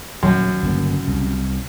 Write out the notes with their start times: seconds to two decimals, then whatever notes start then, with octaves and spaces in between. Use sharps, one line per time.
0.23 D#1 F#2
0.63 G1 C#3 A#3
1.08 C2